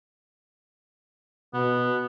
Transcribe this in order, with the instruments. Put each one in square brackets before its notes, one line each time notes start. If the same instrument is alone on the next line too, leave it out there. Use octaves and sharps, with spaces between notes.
[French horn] B2 [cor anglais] B3